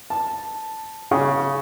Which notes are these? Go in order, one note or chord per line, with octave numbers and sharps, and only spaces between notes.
A5
C#3